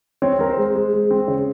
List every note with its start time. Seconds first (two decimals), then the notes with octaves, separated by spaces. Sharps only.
0.22 C4 C#5
0.31 C5
0.39 C4 A#4
0.50 C5
0.57 G#3
0.75 G#3
0.93 G#3
1.11 C4
1.28 C#3